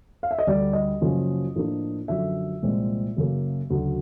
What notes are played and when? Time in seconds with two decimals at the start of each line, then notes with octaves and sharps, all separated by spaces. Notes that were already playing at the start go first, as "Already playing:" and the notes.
0.23 F5
0.31 E5
0.39 D#5
0.47 D2 D3 G3 D5
0.73 D#5
1.01 F#2 C#3 F3 A#3 C#4
1.55 A2 F3 A#3 D4
2.08 F#2 D3 F3 E5
2.62 C2 A#2 F3 G#3 C4
3.17 F#2 C#3 F#3 A#3
3.70 D2 C#3 F#3